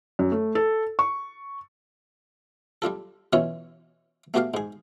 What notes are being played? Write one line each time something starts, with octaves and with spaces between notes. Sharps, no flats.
F#2
A3
A4
C#6
G3 D4 F4 A4
B2 E3 C#4 F4 C#5 E5
A3 B3 F#4 G4 D5 F5
G#2 G#4